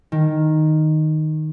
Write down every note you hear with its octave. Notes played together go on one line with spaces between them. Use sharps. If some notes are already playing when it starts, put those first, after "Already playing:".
D#3